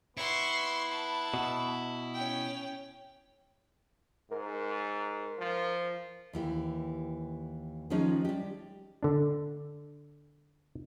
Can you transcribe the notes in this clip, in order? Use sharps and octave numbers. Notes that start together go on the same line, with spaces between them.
B3 E4 B4 C6 C#6
A5
B2
C#4 G5
G#2 A#4
F3
D#2 E3 G4
D#3 F3 G#3 C#4 D#4
G3 G4
D3 D4